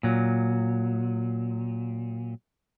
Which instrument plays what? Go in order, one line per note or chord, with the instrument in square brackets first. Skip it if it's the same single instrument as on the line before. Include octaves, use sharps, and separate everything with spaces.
[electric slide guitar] A#2 F#3